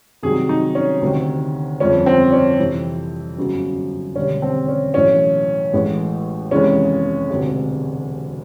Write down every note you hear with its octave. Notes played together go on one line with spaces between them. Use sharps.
C2 C3 D#3 F#3 G#4
D#4
C#4
D2 C3 D#3
G1 F2 C#3 F3 C#4
C4
C#4
F2 C3 E3 G3
G1 F#2 C#3 F#3
E1 D#2 D3 G3 C#4
C4
C#4
B1 A2 E3 C#4
A1 A2 E3 G#3
F1 D#2 C#3 E3 G#3 C#4
E1 D2 C3